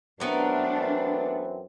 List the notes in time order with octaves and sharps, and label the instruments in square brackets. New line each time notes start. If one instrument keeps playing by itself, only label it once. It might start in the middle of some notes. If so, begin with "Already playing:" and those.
[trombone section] F#2 E3 C4 [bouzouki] A3 B3 A#4 [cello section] D4